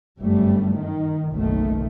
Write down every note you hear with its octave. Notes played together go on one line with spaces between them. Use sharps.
G1 F#2 G3 A3
D#3
F#1 B1 D#3 A3